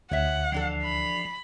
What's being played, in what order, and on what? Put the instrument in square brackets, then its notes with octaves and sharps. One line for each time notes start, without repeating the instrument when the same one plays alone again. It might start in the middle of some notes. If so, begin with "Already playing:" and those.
[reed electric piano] D2 [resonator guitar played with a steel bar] C#5 E5 [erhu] F#5
[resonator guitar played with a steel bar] E3 D4 A4 [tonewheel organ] F3
[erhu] B5